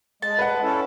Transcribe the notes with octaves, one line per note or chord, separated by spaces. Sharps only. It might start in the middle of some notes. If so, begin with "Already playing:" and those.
G#3 A5
B4 F#5
C#4 E4 A4